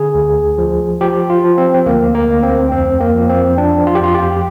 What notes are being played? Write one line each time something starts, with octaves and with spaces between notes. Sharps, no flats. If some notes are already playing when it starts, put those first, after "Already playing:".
Already playing: D3 G#4
D2
F3
F3 G4
F4
F3
C4
C4
D2 A#3
A#3
D2
C4
F2 C4
A#3
F3
C4
F3 D4
F4
G4
F2 F4
G4